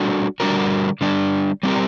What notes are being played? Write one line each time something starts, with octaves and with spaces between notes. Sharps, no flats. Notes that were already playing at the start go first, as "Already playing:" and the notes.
Already playing: G3 D4 F#4 A4
D3 G3 D4 F#4 A#4
D3 G3 D4
G3 C4 G4 A#4